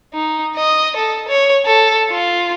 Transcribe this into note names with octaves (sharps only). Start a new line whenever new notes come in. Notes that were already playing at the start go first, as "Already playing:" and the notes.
D#4
D#5
A4
C#5
A4
F4